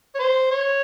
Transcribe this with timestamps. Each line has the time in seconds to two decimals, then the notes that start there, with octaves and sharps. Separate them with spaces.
0.15 C#5
0.19 C5
0.51 C#5